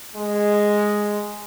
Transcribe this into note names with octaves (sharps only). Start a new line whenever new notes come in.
G#3